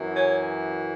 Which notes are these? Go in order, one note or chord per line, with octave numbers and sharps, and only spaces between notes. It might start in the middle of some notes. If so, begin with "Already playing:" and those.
Already playing: F#2 E3
C#4